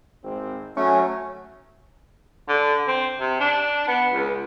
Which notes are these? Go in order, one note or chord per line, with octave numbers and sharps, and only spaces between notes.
G#1 C4
F#3 A3 C#4
D3
C4
C3
D4
B3
C#2